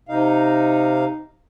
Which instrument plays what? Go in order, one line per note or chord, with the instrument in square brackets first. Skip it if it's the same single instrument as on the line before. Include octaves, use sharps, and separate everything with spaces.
[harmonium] C3 F5 [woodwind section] D#4